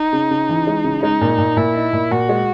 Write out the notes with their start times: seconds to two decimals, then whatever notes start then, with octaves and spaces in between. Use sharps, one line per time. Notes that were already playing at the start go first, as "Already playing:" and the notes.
Already playing: D#4
0.13 C#3
0.31 C#3
0.49 E3
0.67 G#3
0.84 C#3
1.03 G#3 D#4
1.21 A#2
1.38 A#2
1.57 A#2 E4
1.75 D#4
1.93 A#2
2.11 A#2 F#4
2.29 G#3